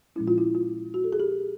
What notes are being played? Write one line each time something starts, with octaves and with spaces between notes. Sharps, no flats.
A#2 F3 G#3 C#4 E4
F4
E4
F4
F#4
A4
G#4
G4